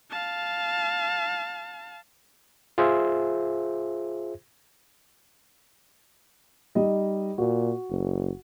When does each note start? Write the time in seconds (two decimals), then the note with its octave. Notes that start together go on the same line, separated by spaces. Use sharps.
0.11 F5 A5
2.78 F4 G#4 C5 E5
6.75 G3 D#4 D#5
7.38 A#2 F#4
7.90 F#1